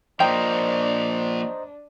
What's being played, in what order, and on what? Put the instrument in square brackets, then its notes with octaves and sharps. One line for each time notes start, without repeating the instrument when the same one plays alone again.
[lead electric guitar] F3 A#3 [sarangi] D4 [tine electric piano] C5 D#5 A#5 [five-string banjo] G5